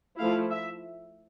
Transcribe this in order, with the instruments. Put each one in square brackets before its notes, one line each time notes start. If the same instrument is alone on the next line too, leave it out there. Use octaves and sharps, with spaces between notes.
[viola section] F3 A3 E4 F5
E5